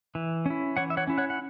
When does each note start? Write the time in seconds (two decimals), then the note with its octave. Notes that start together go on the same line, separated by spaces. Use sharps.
0.15 E3
0.46 C#4 E4
0.77 E3 C#5 F#5
0.90 E5
0.97 C#5 F#5
1.07 C#4 E4
1.18 C#5 F#5
1.30 F#5